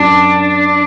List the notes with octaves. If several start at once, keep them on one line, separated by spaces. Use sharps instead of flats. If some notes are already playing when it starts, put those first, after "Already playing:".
Already playing: F#2 D4